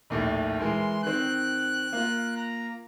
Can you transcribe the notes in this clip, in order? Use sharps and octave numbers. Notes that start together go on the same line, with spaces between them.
A#1 D#2 A2
E3 G#3 A#4 C6
D#3 C4 F#6
A#3 F4
A#5